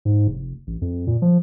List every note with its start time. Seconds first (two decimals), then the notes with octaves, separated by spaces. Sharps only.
0.05 G#2
0.28 F1
0.67 A1
0.82 F2
1.07 A#2
1.22 F3